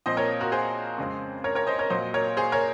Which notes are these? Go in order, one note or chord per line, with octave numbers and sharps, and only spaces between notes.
A#2 F3 C4 C5 D#5
A#4 C#5
F#4 A#4
G#4 C5
F2 C#3 G#3 C4
A#4 C#5
A#4 C#5
C5 D#5
A#4 C#5
A#2 F#3 A#3 C5 D#5
A#4 C#5
G#4 C5
A#4 C#5